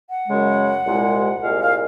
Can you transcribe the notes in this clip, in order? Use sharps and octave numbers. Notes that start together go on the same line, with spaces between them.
F#5
F#2 C#3 G#3
C2 A#2 G#3
C2 A#2 G#3 F5
F5